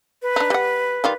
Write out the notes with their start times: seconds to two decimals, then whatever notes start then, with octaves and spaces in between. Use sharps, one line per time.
0.22 B4
0.36 D4 D#4
0.50 G3 F#5
1.04 D#3 G3 F4